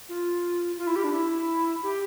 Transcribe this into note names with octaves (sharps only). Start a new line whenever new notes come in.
F4
F4
E4
G4
D4
E4
G4